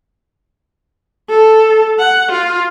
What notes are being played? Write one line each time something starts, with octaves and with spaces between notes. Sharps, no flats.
A4
F#5
F4